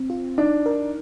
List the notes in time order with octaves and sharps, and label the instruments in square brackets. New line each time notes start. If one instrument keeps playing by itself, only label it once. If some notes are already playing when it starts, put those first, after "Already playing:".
Already playing: [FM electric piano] C4
F4
[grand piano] D4 [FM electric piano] D#4
[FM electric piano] A#4